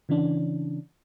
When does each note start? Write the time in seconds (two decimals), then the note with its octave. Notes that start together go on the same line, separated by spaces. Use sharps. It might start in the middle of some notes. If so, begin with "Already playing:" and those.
0.09 C#3 E3 C#4 D4